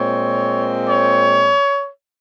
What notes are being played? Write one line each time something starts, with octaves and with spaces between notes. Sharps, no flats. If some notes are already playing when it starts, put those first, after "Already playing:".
Already playing: A#2 G#3 C4 C#5
C#5